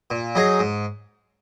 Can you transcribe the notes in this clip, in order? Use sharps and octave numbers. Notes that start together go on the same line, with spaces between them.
A#2
F#3 D#4 G#4
G#2